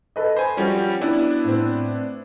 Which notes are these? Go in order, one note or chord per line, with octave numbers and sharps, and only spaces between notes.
A4 B4 D#5
C5 G#5 B5
F3 G3 C#4 F#4 G5
B3 D4 E4
A2 C4